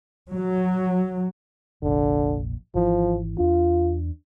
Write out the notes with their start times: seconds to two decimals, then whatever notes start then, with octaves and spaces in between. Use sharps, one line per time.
0.32 F#3
1.83 F1 A#1 D3
2.75 G#1 E3 F3
3.38 E2 D4 F4